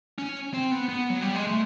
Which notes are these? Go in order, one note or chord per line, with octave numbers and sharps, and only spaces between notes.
C#4
C4
B3
B3
F#3
G3
G#3
A3